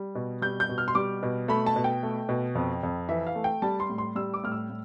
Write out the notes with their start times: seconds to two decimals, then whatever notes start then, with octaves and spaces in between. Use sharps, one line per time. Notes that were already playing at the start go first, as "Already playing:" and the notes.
Already playing: G3
0.15 B2
0.42 G3 G6
0.60 G6
0.69 B2
0.78 F6
0.88 C6
0.95 G3 D6
1.23 B2
1.48 A3 B5
1.66 A5
1.76 B2
1.84 G5
2.03 A3
2.29 B2
2.55 F2
2.83 F2
3.09 E3 E5
3.27 F5
3.35 A3
3.44 G5
3.62 G3 A5
3.80 C6
3.89 A2
3.98 C6
4.15 G3 E6
4.34 D6
4.43 A2 F6
4.52 E6
4.70 A2